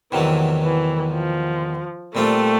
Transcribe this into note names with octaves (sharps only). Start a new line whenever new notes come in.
E2 C3 D#3 E3 F#3 A3
E3
F3
A#2 G3 A3 C4 F4